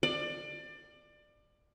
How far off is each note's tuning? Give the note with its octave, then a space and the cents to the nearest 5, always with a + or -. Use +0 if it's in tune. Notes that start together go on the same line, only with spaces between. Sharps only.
D5 +25